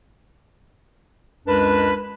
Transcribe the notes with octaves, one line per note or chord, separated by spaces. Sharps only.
C#2 F#2 G#3 D4 A#4 B4